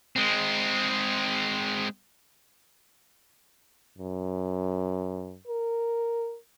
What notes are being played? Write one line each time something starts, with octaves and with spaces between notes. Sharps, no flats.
G#3 C4
F#2
A#4